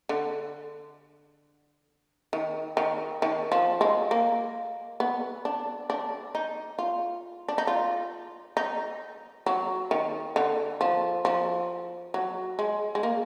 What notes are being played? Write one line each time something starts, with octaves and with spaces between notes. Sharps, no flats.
D3
D#3
D#3
D#3
F3
G#3
A#3
B3
D4
D4
D#4
F4
D4
D#4
F4
D#4
F#3
D#3
D3
F3
F3
F#3
G#3
G#3
A#3